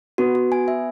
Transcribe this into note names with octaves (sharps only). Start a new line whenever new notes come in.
B3 F#4
F#4
G#5
E5